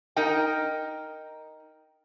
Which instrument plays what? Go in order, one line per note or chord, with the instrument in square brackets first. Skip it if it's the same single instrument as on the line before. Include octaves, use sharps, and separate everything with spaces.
[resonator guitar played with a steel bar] D#4 A#4 D#5 G5